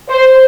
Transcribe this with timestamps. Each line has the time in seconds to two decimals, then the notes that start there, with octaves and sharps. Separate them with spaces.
0.09 C5